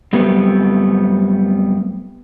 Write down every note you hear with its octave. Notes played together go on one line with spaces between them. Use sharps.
F#2 G3 A3 B3 C4